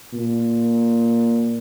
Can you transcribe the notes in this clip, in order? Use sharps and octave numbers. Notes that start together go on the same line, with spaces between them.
A#2